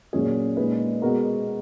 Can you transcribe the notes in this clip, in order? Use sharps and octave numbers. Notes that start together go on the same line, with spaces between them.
A#2 F#3 C#4 G#4
A#2 G#3 D#4 G#4 B4
B2 G#3 B3 F#4 A#4